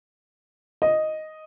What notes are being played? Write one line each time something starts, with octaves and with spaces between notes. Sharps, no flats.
D#5